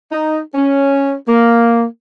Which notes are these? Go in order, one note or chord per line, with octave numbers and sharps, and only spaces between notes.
D#4
C#4
A#3